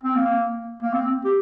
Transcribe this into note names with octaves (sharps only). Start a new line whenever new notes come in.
C4
A#3
A#3
C4
G4